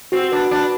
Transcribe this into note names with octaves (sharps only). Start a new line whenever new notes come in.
C4 F#4
D4 B4
D4 B4